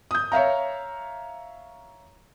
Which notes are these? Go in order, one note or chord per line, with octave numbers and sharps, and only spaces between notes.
D#6 G6
C#5 E5 F5 A#5